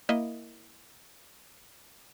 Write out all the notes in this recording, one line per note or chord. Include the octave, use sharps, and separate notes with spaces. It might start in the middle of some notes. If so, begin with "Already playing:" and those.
A#3 E4 D#5